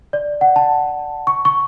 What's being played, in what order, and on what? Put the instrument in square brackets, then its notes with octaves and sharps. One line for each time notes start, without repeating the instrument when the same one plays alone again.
[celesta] D5
F#5
A5
C#6
C#6